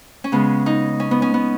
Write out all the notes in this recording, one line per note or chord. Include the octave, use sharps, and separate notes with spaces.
C#4
C#3 G#3 B3
D#4
C#4
B3
C#4
B3